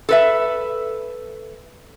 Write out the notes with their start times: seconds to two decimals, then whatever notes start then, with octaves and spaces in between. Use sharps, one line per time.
0.09 A4 B4 E5